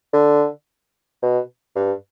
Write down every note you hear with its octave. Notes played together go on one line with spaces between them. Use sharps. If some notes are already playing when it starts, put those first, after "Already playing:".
D3
B2
G2